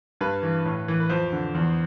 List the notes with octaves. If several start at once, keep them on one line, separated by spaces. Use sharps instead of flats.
G2 B4
E3
A2
E3
B4
F2 C5
D3
E2